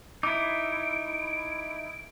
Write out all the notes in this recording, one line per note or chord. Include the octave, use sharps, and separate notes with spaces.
D#4 E4 D6 D7